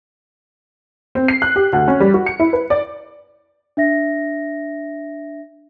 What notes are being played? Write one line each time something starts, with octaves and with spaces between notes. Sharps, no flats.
C4
C7
F#6
G4
D2
C#4
G3
F#4
C#7
E4
B4
D5
D4 E5 A#6